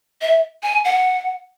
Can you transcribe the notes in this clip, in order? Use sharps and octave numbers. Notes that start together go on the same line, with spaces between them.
E5
G#5
F#5